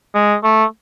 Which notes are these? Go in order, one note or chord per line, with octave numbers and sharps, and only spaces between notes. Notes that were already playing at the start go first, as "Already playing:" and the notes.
G#3
A3